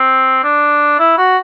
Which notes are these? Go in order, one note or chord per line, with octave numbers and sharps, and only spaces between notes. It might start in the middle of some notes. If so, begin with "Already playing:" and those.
Already playing: C4
D4
E4
F#4